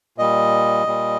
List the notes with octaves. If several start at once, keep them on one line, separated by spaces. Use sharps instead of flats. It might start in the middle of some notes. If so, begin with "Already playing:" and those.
A#2 G3 D#5
A#2 G3